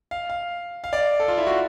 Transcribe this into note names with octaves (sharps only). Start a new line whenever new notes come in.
F5
F5
F5
D5
A4
F4
E4
F#4